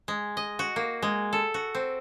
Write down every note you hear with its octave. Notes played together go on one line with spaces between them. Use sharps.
G#3
D#5
F#4
A#3
G#3
A4
F#4
C4